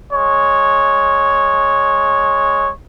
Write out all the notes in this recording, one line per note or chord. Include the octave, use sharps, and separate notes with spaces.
G#3 C#5